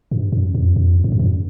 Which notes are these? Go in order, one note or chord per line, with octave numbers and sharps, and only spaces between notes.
G2
F#2
F2
F2
F#2
G2
F#2